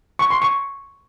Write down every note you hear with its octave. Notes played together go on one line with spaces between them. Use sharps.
C#6
C6
C#6